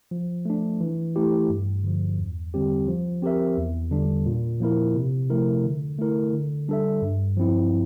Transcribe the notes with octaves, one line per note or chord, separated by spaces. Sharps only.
F3
A3 D4
E3
A3 E4 G4
G2
D3 F3
E2
D3 G3 C4 G4
F3
C4 G4 A#4 E5
E2
D3 G3 D4
A#2
F3 A#3 E4 A#4
C3
F3 A3 E4 A#4
D3
A3 E4 A#4
D3
G3 D4 A4 E5
G2
F3 C4 E4